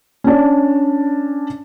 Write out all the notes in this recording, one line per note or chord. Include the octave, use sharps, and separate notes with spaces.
C#4 D4